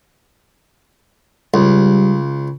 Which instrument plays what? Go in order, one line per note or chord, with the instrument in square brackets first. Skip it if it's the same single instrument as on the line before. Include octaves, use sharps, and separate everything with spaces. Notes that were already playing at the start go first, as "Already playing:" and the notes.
[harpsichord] C#2 [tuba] G3